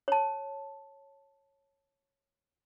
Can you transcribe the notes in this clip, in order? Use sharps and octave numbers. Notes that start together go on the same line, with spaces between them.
C#5 A5